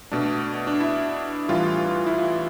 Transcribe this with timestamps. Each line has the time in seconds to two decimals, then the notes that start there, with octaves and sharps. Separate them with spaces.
0.12 B2 A3 D4
0.67 D4
0.80 E4
1.49 A2 E3 G3 F4
2.06 E4
2.18 F4